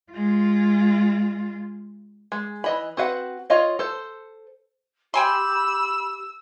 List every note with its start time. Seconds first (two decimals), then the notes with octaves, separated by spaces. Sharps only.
0.12 G#3 F4
2.32 G#3
2.64 E3 D#5 B5
2.97 C4 F#4 B4 F5 F#5
3.50 F4 C#5 D#5 F5
3.79 A4 C5
5.14 G4 G5 G#5 B5 C6 E6